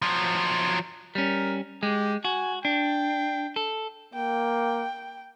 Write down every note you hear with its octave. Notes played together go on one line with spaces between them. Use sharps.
F3 F#3
G3 C#4 A#4
G#3 G4
F#4 G#5
D4 G5
A4
A#3 G5